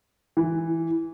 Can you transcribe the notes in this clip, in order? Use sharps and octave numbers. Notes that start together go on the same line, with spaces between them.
E3